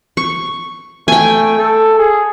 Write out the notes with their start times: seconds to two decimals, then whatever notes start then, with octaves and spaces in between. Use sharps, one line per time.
0.17 C#6
1.08 A3 G5 G#5
1.59 A4
1.99 G#4